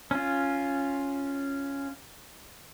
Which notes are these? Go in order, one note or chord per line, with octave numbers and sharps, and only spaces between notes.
C#4 F4